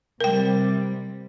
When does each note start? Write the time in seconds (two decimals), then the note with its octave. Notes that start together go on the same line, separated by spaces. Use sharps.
0.20 C3 G3 A#4 G5